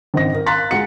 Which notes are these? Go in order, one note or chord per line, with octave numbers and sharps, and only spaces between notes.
G#1 C4 D#5 A#6
A#4
F5 A#5 C6 F#6 A6 B6
G#3 F#5 C#7